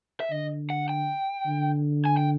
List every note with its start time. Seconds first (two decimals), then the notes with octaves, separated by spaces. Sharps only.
0.20 E5
0.31 D3 D#5
0.70 F#5
0.89 G5
1.47 D3
2.05 G#5
2.17 G5